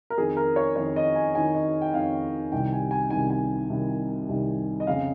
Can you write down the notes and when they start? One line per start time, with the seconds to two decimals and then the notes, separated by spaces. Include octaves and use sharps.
0.10 A#4
0.18 F2 D#3 G#4
0.37 A#4
0.56 C#5
0.76 F2 D#3 C#5
0.96 D#5
1.15 G#5
1.35 F2 D#3 G#5
1.55 D#5
1.82 G5
1.93 F2 D#3 F5
2.52 C2 C3 D#3 G5
2.72 G#5
2.91 G#5
3.10 C2 C3 D#3 G#5
3.30 G#5
3.70 C2 C3 D#3
4.29 C2 C3 D#3
4.80 D#5
4.87 F2 C#3 F5